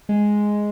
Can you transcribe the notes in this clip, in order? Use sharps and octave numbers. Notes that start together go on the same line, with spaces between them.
G#3